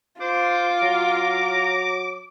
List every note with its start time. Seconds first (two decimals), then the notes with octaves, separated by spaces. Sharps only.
0.21 F4 C5 D6
0.82 F#3 A#5